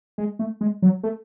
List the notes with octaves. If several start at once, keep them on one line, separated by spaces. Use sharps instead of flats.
G#3
A3
G#3
F#3
A3